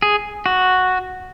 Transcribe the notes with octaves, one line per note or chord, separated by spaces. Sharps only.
G#4
F#4